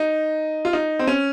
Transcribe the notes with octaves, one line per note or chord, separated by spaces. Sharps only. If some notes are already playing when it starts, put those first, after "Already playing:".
Already playing: D#4
F4
D#4
C4
C#4